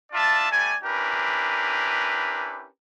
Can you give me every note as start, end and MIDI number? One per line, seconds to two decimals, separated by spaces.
0.13 0.50 62
0.13 0.50 65
0.13 0.50 74
0.13 0.50 76
0.13 0.50 81
0.50 0.74 55
0.50 0.74 57
0.50 0.74 74
0.50 0.74 80
0.83 2.67 61
0.83 2.67 62
0.83 2.67 64
0.83 2.67 67
0.83 2.67 70
0.83 2.67 71